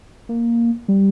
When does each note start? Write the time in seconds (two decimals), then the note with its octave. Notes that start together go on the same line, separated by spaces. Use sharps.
0.29 A#3
0.88 G3